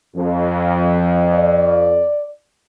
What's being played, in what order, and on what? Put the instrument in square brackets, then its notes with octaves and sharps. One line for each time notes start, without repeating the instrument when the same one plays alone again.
[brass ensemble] F2
[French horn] D5